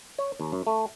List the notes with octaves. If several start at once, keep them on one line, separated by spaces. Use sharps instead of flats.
C#5
D#2
F#2
A3